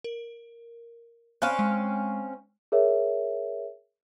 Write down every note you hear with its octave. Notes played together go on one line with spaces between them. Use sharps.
A#4
C4 C#4 F5 B5 C#6 F#6
G#3
G#4 A#4 C#5 E5